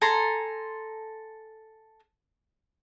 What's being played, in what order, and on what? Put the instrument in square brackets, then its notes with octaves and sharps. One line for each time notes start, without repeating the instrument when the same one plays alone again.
[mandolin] A4 G#5 A#5 C6